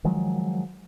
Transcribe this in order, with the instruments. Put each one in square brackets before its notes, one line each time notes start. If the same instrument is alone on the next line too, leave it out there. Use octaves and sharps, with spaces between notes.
[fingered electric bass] D#3 F3 F#3 G#3